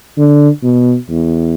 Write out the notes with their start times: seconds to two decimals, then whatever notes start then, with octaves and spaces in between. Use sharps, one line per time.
0.17 D3
0.63 B2
1.09 E2